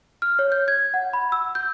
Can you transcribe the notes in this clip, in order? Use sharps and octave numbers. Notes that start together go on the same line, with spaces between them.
F6
C#5
G6
G#6
F#5
B5
E6
G6